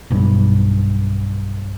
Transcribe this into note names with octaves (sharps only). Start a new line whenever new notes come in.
B1 G2